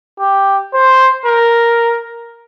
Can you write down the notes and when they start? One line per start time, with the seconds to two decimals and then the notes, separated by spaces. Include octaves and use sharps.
0.20 G4
0.74 C5
1.26 A#4